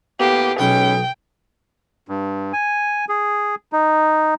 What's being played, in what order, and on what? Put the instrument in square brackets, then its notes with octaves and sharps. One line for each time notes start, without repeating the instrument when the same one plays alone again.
[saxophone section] A2 A#3 B3 [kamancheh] G4
[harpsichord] B1 D#6 [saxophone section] E3 G#3 C#4 [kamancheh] G5
[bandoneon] G2
G#5
G#4
D#4